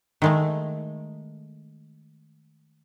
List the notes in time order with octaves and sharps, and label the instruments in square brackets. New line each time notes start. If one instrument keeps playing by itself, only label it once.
[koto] D#3 G#3 A3